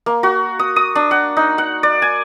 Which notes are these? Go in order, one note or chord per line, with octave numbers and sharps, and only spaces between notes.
A#3
F#4
D#6
D#6
D4
F#5
D#4
F#5
D5
G#5